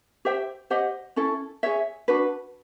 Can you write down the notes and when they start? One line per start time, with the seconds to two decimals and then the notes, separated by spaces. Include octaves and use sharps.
0.25 G4 C5 E5 G5
0.70 G4 C5 D#5 F#5
1.16 C#4 E4 A4
1.63 G#4 C#5 E5
2.08 D4 F#4 B4